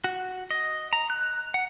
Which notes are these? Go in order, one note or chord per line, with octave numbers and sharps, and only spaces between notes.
F#4
D#5
A#5
F#6
F#5